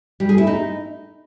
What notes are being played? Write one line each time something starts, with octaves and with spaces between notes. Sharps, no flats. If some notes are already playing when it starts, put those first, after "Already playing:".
G3
G#4
E4
D#4